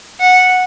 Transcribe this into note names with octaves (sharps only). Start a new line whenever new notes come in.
F#5